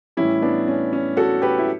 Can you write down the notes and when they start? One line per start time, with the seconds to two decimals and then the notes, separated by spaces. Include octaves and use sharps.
0.17 A2 E3 G3 C#4 E4
0.42 B3 D4
0.68 C#4
0.93 C#4
1.17 F#4 A4
1.42 G4 B4
1.58 E4